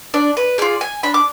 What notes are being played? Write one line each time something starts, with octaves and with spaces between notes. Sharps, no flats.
D4 D5
B4
F4 G#4 D5
G#5
D4 B5
D6